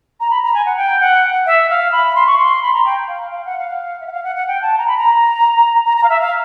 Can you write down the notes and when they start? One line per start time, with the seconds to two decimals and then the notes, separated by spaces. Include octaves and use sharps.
0.20 A#5
0.31 B5
0.43 A#5
0.54 G#5
0.66 F#5
0.77 G5
1.01 F#5
1.46 E5
1.70 F5
1.92 B5
2.16 C6
2.27 C#6
2.38 C6
2.63 B5
2.74 A#5
2.85 G5
3.08 F5
3.31 F5
3.46 F#5
3.58 F5
4.01 E5
4.07 F#5
4.12 F5
4.24 F#5
4.36 F#5
4.48 G5
4.62 A5
4.78 A#5
4.88 B5
4.97 A#5
5.85 A#5
5.97 A#5
6.03 F5
6.09 E5
6.21 F5